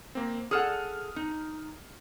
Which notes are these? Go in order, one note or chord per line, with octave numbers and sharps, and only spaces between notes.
A#3 C4
G#4 A4 F#5 D#6 F6
D#4